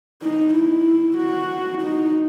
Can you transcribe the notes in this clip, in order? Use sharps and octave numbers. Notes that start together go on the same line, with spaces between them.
D#4
E4
F#4
D#4